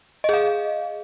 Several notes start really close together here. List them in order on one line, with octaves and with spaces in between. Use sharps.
D#5 G#4 F5